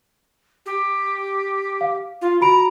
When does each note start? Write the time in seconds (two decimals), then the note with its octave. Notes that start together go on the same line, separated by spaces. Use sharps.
0.66 G4
1.81 F5
2.21 F4
2.41 F#4 A#5 B5 D7